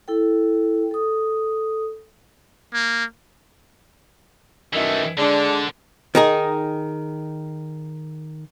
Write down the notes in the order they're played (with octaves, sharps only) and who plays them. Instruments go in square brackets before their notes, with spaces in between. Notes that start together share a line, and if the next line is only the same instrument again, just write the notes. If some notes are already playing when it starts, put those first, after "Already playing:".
[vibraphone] E4 A4 G5
A4 D#6
[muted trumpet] A#3
[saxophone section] F#2 D#3 E5 [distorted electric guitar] E3 A3
[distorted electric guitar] D3 [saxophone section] G#3 D4
[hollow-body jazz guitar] D#3 D#4 G#4